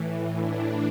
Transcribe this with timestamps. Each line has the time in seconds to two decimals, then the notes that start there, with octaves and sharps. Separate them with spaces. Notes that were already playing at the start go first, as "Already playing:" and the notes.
Already playing: A2 E3
0.36 D4